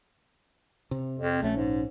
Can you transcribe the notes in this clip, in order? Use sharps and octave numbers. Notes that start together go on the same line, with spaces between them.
C3
F2
A#1 A3 C#4
G#2